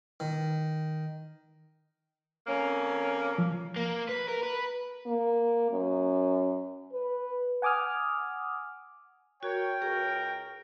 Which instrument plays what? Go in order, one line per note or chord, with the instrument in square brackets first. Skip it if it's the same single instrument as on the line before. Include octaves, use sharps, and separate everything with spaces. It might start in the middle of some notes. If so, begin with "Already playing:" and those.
[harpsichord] D#3
[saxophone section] F2 A#3 C#4
[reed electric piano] F3
[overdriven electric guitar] A#3
B4
A#4
B4
[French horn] A#3
F#2
B4
[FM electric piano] F#5 G#5 D6 D#6 F6
[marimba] F#4 [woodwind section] A#4 C#5 [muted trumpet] G5
[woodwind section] C#2 F#4 A#4 [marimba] G#4